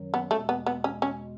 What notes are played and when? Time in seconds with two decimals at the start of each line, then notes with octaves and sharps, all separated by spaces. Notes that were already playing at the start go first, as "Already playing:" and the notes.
Already playing: F#2 D#3 F#3
0.14 B3
0.31 E2 B2 G#3 A3
0.49 B3
0.66 B3
0.84 C#4
1.02 C#4